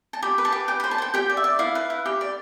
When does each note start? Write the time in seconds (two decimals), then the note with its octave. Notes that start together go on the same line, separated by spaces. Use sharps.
0.13 A5
0.22 G4 B5
0.38 B4
0.45 A5
0.52 G4
0.68 G4 G5
0.80 B5
0.84 C5
0.91 A5
0.98 C5 G5
1.14 G4 G5
1.30 D5
1.37 E5
1.44 D5
1.59 E4 F5
1.75 B4
1.90 E4
2.06 G4
2.21 D5